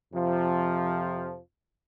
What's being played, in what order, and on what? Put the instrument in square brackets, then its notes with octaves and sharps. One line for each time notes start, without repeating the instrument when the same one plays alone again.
[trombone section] F2 C3 F3